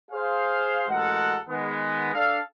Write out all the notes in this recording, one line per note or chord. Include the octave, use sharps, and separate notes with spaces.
G#4 C5 F5
A1 G#3 F#4 A4 A#4 F#5
D#3 G#3 B3
D4 A4 F5